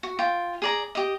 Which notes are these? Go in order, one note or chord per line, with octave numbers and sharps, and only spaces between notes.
F#4
F4 G5
G#4 D5 A#5
G4 D#5